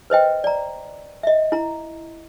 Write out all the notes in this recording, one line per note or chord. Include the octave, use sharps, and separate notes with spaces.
B4 C5 D#5 G5
D5 A#5
D#5 E5
E4 A#5